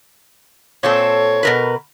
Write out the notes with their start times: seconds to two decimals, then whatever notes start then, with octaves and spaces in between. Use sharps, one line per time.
0.83 A#2 C4 A4 C#5
1.43 B2 A#4 B4